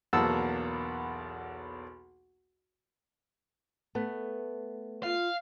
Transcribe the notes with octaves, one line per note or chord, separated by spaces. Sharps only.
B1 E2 A#3 F#5 A5 E6
A3 B3
F4 F5